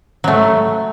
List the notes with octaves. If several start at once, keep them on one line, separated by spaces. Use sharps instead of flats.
F#3 A3